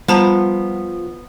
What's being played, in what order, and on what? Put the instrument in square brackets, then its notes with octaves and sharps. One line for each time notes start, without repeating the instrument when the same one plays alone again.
[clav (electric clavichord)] F3 [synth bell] G3 [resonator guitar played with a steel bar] B3 [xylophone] C5 A5 A#5